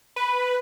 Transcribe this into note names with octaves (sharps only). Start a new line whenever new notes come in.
B4